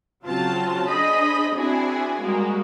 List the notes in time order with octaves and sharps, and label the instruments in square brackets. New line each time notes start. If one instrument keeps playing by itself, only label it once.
[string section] C#3 F#3 C4 F4 A5
D4 G#4 C5 D#5 B5
C4 D4 E4 F#4 G#4
G3 G#3 A#3 F#4